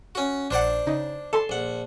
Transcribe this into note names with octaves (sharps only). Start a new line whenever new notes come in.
C#4 F#4
A#1 D4 C5 D5 F#5
C#3 D#4
A4 A5 C6
A#1 F#5